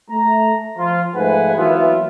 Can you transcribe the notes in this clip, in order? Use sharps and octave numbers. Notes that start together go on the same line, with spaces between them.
A3 A#5
F3 F4
G#2 F3 A3 B4 F#5 G#5
E3 F#3 A#3 B3 F4 E5